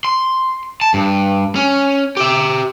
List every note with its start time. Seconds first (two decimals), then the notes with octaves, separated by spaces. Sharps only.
0.05 C6
0.81 A5
0.94 G2
1.56 C#4
2.17 G4 E5